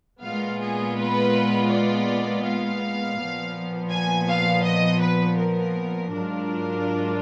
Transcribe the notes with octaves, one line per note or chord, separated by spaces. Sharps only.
A#2 G#3 B3 F4 F5
G#4
B4
D5
F5
A#2 F3 B3
G#5
F5
D#5
B4
A#4
G#2 F#3 D4 F4 A#4